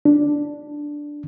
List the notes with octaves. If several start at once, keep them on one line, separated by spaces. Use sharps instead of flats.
D4